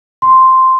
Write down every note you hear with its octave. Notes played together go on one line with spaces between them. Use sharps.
C6